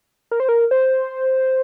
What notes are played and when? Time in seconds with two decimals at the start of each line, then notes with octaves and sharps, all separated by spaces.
0.31 A#4
0.40 C5
0.49 A#4
0.71 C5